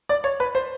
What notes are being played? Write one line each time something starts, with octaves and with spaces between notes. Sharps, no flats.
D5
C#5
B4
C5